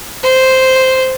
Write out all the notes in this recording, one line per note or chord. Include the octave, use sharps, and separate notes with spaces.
C5